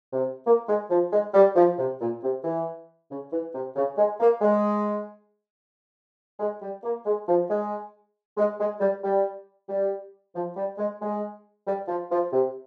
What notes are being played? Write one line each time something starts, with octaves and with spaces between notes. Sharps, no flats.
C3
A#3
G#3
F3
G#3
G3
F3
C3
A#2
C3
E3
C#3
E3
C3
C#3
G#3
A#3
G#3
G#3
G3
A#3
G#3
F3
G#3
G#3
G#3
G3
G3
G3
F3
G3
G#3
G#3
G3
F3
F3
C3